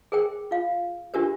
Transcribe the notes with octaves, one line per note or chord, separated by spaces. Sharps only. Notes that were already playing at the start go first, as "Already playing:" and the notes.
G#4 A#4 C5 G5
F4 F5
D4 F4 G4 A#4 C5